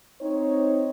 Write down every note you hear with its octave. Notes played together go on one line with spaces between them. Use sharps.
C4 D#4 C#5